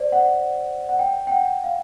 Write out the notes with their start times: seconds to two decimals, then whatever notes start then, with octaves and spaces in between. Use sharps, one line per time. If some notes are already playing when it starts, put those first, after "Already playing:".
Already playing: C5 D5
0.12 F#5
0.89 F#5
0.99 G5
1.27 G5
1.31 F#5
1.64 F5